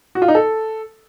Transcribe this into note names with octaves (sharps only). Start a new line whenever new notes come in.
F#4
F4
D#4
A4